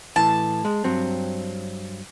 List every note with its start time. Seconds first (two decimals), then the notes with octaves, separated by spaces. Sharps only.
0.16 A2 E3 A5
0.65 G#3
0.84 G2 F#3 C4